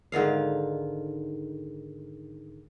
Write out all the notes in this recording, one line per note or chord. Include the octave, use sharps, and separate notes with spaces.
G#2 D3 D#3 F5